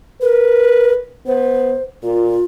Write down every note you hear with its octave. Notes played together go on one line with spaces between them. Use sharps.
A#4 B4
B3 C5
A#2 F4